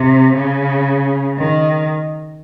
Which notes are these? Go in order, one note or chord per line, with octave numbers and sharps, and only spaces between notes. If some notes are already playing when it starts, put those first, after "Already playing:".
Already playing: C3
C#3
D#3